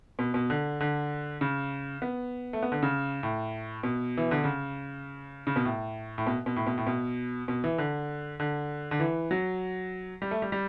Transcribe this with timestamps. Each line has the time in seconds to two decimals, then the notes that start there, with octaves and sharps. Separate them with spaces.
0.19 B2
0.34 B2
0.50 D3
0.80 D3
1.41 C#3
2.02 B3
2.53 A3
2.63 B3
2.72 D3
2.83 C#3
3.23 A2
3.83 B2
4.17 E3
4.31 D3
4.44 C#3
5.47 C#3
5.56 B2
5.65 A2
6.18 A2
6.27 B2
6.46 B2
6.56 A2
6.66 B2
6.78 A2
6.87 B2
7.48 B2
7.64 E3
7.78 D3
8.40 D3
8.91 D3
9.00 E3
9.31 F#3
10.22 G3
10.31 A3
10.42 G3
10.52 G3